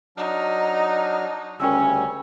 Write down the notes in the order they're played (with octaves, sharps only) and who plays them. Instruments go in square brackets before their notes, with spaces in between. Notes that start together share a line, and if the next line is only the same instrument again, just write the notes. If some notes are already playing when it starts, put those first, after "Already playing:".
[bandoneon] F#3 D4 F6 [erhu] D#4
[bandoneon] D2 C#3 G3 [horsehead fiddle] C#4 [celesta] A#4 G5 E6